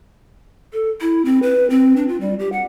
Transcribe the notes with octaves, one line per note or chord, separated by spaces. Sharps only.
A4
E4
C4
B4
C4
D4
F4
G3
G4
F#5